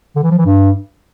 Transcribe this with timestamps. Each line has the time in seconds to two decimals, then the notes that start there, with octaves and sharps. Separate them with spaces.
0.16 D3
0.23 E3
0.31 F3
0.38 E3
0.46 G2